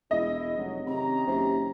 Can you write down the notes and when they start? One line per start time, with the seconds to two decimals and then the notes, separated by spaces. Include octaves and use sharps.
0.11 E1 G#3 E4 D#5
0.57 F1 F#3
0.86 C3 D#3 C#4 A#5
1.27 F#1 C3